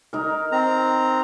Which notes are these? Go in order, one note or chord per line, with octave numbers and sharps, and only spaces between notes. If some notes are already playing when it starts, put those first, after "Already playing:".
D#4 A#4
C4 A#5